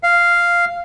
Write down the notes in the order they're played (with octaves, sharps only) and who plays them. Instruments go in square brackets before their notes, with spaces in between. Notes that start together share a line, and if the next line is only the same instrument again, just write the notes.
[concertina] F5